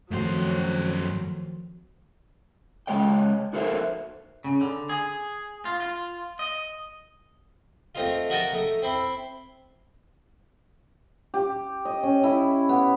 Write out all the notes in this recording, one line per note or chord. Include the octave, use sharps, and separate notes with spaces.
F#2 D#3 F3 F#3 A3 C4 C5
C#3 G#3 C#5 D#5 G5
D#4 F#4 A4 A#4 C5 E5
C#3
D3
G#4
F4
F4
D#5
A3 C4 D#4 F4
F#4 A#4 D#5 G5 A5
A3 D#4
C4 E4 C6
G4
D#5
C#4
E4 B5
B3